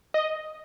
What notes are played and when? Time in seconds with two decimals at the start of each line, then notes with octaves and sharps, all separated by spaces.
0.14 D#5